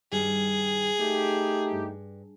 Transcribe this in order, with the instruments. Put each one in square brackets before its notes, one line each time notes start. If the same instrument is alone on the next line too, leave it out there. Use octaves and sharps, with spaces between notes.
[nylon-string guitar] G2 D#3 G3 [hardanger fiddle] G#4
[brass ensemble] A3 D#4 G4 [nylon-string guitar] D5
[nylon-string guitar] G2